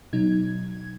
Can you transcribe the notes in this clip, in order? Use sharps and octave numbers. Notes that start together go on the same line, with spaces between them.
B2 F#3 D#4 G#6